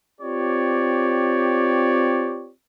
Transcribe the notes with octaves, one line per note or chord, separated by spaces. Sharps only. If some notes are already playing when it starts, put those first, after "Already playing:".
C4 F4 G4 C#5 D5